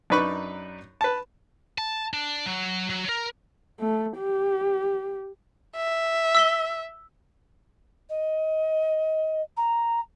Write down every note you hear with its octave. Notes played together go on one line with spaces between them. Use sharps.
F#2 D4 D#4 B4 B5 C#6
B4 A5
A5
D4
F#3
F#3
A#4
A3
G4
E5
E6 B6 G7
D#5
A#5